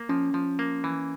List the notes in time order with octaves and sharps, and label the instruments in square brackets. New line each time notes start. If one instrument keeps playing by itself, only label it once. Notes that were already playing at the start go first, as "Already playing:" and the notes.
Already playing: [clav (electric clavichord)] A#3
[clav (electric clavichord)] F3 [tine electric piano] C#4
[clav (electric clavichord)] F3
A#3
E3